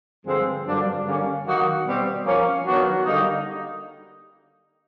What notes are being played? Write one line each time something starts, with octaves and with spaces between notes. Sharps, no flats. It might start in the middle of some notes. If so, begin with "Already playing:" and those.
G2 D3 F3 G#3 C4
G2 D3 F#3 A#3 D4
D3 G3 A#3 C#4
D#3 F#3 A#3 D#4 F#4
B2 G3 C4
F3 A#3 C#4
D#3 F#3 B3 D4 F#4
D3 G3 A#3 D#4